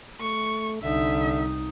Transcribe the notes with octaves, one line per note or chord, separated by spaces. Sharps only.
A3 C#6
C2 D3 D#4 E5